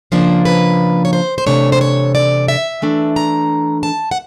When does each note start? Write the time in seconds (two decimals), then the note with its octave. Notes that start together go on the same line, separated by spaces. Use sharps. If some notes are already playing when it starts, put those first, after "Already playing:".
0.12 C#3 F3 A#3 D4 C5
0.45 B4
1.05 C#5
1.13 C5
1.38 C5
1.46 C3 E3 A3 D4 C#5
1.72 C5
1.81 C#5
2.15 D5
2.48 E5
2.82 E3 A3 D4
3.16 A#5
3.83 A5
4.11 F#5